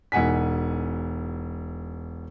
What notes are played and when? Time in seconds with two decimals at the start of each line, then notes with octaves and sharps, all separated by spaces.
0.12 E1 D#4 F#5 G#5 B6